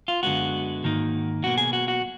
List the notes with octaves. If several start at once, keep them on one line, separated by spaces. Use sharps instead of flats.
F4
F#2 D3 G#3 B3 F#4
G#2 D#3 A#3 D#4
B1 B2 A#3 F#4
G#4
F#4
F#4